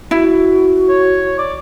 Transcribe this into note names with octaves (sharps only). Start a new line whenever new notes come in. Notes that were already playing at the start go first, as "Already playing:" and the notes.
E4 F#4
C#5
D5